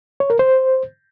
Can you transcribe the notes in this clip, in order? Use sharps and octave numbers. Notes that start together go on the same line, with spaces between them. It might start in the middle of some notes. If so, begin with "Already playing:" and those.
C#5
A#4
C5